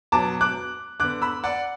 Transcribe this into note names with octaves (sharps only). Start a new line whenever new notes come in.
B2 F#3 B3 A5 D6
D6 F#6
D3 B3 D6 F#6
B5 E6
D5 F#5